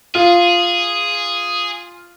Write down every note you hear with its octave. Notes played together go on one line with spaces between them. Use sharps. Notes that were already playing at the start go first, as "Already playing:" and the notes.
F4 G#4